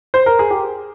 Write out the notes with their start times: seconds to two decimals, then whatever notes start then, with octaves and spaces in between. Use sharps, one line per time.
0.14 C5
0.26 A#4
0.39 G#4
0.51 G4